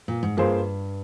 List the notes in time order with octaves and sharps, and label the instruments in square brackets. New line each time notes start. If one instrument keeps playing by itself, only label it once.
[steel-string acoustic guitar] A#2
G#2
[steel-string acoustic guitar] G2 [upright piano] A#3 F4 G#4 C5